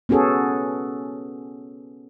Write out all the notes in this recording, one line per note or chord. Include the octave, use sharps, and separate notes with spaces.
B3 C#4 F#4 G#4 A4